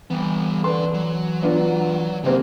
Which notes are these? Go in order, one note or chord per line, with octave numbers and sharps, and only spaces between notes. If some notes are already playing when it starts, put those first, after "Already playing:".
E3 G3 B3
A4 B4 D5 C6
F#3
B3 D4 F4
D#2 C#3 E3 A#3 C4 G4